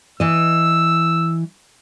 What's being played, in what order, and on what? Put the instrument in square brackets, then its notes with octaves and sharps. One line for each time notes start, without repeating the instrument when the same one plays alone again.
[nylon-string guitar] E3 D#5 [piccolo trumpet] E6